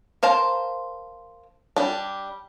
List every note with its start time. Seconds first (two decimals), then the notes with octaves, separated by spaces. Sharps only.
0.23 A#4 C5 F5 A5
1.76 G3 D4